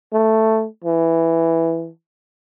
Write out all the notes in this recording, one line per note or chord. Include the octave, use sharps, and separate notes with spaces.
A3
E3